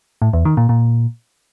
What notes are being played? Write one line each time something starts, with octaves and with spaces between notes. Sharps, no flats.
A2
E2
D#3
A#2
A#2